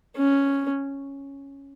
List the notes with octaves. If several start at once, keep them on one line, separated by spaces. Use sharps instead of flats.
C#4